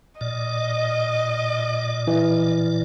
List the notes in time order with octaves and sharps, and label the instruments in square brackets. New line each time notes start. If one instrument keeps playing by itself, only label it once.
[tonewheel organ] A#2 D5 [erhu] D#5
[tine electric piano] E3